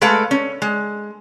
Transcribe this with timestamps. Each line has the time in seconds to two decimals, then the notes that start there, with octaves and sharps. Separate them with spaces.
0.02 G#3 A3 A4 B4 F5
0.31 C#4
0.62 G#3